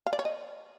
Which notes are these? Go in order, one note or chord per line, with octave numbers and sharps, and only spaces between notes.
F5
D5
C#5
D#5